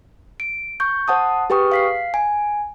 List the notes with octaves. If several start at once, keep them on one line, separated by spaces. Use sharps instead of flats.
D7
C#6 G6
C5 F#5 A5 D#6
G4 G#4 B4 G5 C#6 D#6
F5 B6 C7
G#5